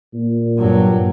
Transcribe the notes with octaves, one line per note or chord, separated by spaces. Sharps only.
A#2
G2 F#3